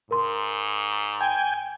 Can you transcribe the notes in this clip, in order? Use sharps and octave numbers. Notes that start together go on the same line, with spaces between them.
G#2 A#4 C6
G5 G#5